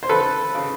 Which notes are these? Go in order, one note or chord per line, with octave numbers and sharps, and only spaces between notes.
C5
C#3 A4 B4
C#3